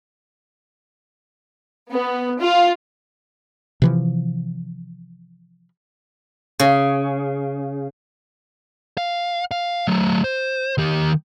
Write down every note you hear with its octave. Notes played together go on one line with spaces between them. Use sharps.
B3
F4
C3 E3 F3
C#3
F5
F5
F#3 A3
C5
D#3 G4